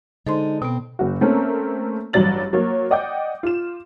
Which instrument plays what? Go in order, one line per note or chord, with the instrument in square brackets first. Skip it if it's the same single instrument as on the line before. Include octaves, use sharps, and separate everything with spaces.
[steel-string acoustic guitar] D3 G#3 D#4 [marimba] A4 C5 C6
[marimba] B2 B3 [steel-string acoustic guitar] C4
[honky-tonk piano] F#1 F#4
A3 A#3 C4 C#4 A4 A#4
A1 G2 F#3 D5 A6 F#7
F#3 A#3 C#5
D5 D#5 F#5 G5 D6 G6
F4 E7